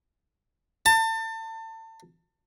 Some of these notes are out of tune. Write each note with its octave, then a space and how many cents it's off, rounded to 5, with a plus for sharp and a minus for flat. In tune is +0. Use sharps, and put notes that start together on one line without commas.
A5 +30